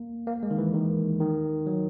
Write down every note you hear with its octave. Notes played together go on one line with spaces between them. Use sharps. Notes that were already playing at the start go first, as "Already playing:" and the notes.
Already playing: A#3
A#3
G#3
D#3
E3
D#3
D#3
F#3